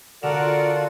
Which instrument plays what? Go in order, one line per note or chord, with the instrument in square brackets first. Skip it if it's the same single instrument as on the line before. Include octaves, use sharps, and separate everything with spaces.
[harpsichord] D3 [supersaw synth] F4 [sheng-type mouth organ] F#4 A4 F#5 [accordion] A#4 D5